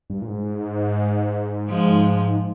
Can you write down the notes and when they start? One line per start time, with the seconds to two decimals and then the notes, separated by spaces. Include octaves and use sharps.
0.10 G2
0.22 A#2
0.27 G#2
1.70 F3 G#3